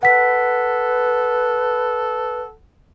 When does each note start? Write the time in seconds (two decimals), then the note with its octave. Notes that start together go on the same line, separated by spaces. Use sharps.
0.03 A4 B4 F#5 B6